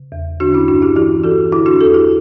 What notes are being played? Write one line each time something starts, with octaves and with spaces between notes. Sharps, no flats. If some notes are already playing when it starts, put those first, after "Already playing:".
Already playing: C#3
E2
D3 D4 F#4
C#4 E4
G2 D4 F#4
E4 G4
E3 E4 G4
E3 F#4 A4
D3 E4 G4
D4 F#4
E2 F#4 A4
E4 G4